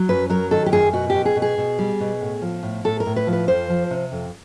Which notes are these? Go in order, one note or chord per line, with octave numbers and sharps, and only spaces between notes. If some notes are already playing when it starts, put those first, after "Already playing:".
Already playing: F#3
F#2 B4
F#3 A#4
D#3 A4
G4
F#2 G#4
B2 F#4
B2 G4
G#4
B2
G#4
B2
G3
B2
A2
F3
A2
A2 A4
A#4
A2
B4
F3
B4
F2 C5
F3
C3
F2